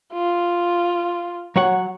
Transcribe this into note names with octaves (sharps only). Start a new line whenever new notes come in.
F4
F#3 C#5 F#5